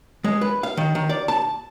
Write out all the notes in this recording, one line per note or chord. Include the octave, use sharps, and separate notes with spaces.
G#3
B4
F5
D#3
D#3
D5
A5